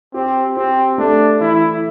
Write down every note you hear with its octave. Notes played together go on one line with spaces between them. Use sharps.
C4 G4
C4 G4
A3 D4
E3 E4